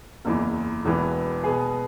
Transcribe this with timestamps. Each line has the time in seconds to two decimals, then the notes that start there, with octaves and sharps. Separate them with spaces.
0.25 F#1 E2 E3
0.84 E1 E2 E3 B3
1.44 B2 B3 G#4